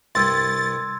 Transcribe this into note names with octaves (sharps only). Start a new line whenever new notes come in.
C2 G2 G3 C6 E6 G#6 A6